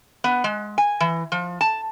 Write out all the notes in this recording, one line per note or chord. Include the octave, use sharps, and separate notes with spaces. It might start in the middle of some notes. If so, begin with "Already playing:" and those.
B3
G#3
G#5
E3
F3
A5